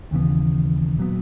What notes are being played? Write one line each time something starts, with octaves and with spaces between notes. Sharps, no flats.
D#2 C#3 E3 B3
A#2 F#3 B3